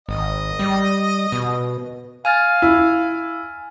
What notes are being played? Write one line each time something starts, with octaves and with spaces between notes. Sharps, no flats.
G#1 D#5
G3
B2
F5 G#5 F6 A6
E4